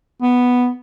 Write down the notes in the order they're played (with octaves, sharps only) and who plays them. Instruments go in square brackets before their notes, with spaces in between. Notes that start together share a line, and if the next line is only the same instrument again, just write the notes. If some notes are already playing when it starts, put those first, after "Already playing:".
[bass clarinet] B3